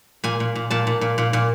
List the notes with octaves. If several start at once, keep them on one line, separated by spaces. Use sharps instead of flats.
A#2 G#5
A#2
A#2
A#2 A5
A#2
A#2
A#2
A#2